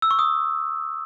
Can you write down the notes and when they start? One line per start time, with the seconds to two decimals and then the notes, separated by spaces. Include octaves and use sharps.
0.02 E6
0.11 C#6
0.19 D#6